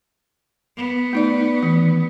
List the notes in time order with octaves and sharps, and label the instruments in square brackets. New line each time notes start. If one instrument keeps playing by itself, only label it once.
[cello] B3
[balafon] A3 D#4 D5
D#3 E3